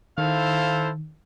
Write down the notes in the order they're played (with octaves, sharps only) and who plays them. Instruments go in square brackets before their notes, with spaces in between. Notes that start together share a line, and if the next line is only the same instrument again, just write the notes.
[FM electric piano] D#3 [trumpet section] E4 A4 C5 [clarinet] F5